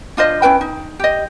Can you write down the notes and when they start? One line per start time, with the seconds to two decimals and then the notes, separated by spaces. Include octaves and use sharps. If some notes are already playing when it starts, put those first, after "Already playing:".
0.17 D4 F4 C5 D#5
0.42 C#4 E4 B4 G5
0.61 D#4
1.00 G4 D#5